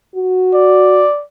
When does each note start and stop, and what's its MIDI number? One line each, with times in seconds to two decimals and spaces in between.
0.15 1.06 66
0.54 1.23 74